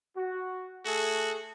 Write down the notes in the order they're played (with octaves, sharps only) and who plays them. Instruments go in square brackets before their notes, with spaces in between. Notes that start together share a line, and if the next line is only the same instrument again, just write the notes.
[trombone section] F#4
[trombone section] A3 G#4 A4 [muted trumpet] F#4